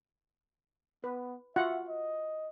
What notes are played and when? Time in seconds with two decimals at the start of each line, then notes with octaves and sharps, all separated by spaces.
1.04 B3 B4
1.56 F4 F#4 E5 F#5
1.88 D#5